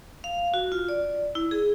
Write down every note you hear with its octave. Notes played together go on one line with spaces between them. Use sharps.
F5
F#4
F4
D5
E4
G#4